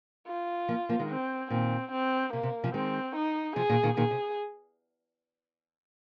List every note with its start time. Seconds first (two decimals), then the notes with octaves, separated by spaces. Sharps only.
0.28 F4
0.69 F3 A#3
0.89 F3 A#3
0.99 D#3 G#3
1.09 C4
1.50 A#2 D#3 C4
1.92 C4
2.33 C3 A#3
2.43 C3
2.64 C3 F3
2.74 D#3 G#3 C4
3.16 D#4
3.56 C3 F3 G#4
3.69 A#2 D#3
3.83 A#2 D#3
3.97 A#2 D#3 G#4
4.11 C3